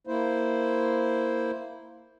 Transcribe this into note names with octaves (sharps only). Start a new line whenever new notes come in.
A#3 E4 C5